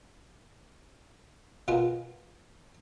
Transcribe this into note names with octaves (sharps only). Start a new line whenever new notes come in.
B2 F4 G#4 A#4